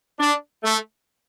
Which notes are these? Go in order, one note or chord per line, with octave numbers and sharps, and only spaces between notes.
D4
A3